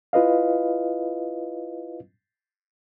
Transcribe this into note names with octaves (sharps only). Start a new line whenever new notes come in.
E4 F4 B4 D#5 F5